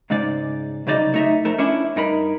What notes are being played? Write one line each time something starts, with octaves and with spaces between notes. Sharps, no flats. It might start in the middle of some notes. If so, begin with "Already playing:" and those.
G#2 C#3 G#3 D#4 D5
C2 C#3 F#3 D#4 D5 D#5
A3 D#4 E5
F2 A3 A#4
C#4 D4 E4
G2 D#4 A#4 B5